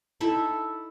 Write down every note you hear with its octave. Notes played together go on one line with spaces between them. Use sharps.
D#4 E4 A4 E5